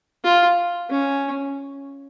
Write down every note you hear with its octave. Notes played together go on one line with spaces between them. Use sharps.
F4
C#4